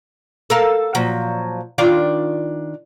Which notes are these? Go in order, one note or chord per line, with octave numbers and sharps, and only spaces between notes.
A4 A#4 F5
A#2 F3 F#3
D#3 D4 F4